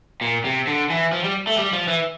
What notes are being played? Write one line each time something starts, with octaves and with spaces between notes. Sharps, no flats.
A#2
C3
D3
E3
F3
G3
A3
G3
F3
E3